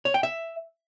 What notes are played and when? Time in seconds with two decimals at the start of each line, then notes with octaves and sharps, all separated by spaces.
0.05 C#5
0.14 G5
0.23 E5